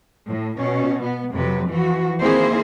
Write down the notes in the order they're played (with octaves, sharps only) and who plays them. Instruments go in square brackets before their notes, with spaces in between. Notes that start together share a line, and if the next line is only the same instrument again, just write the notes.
[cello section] A2
B2 C#4
B3
F2 C3 F#3 B4
E3 F3 F#4
D#3 A#3 C4 E4 G#4 C5